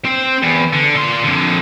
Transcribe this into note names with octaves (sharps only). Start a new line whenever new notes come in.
C4
E2
D3
A#2 C6
F2 D3